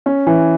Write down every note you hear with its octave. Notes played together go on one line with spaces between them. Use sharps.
C#4
E3